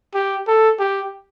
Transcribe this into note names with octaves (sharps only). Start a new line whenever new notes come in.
G4
A4
G4